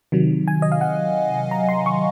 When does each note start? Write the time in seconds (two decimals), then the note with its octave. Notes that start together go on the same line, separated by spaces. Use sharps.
0.12 C3 D#3 F#3
0.48 G#5
0.62 D#5
0.72 F5
0.81 F#5
1.51 A#5
1.69 C6
1.86 C#6